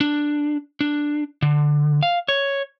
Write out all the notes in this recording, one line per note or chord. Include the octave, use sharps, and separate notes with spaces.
D4
D4
D3
F5
C#5